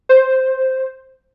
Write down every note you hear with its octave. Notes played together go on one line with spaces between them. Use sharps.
C5